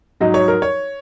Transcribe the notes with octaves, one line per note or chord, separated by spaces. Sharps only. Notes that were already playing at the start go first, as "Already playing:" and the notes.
G#2 F#3 D#4 D#5
C#5
A#4
C#5